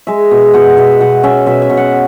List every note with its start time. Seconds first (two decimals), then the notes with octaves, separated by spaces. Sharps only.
0.07 G#3 E5
0.31 B2
0.53 B2 F#5
0.77 B2 E5
1.00 B2 F#5
1.23 C#4 E5
1.46 B2 E5
1.62 E5
1.69 B2
1.77 F#5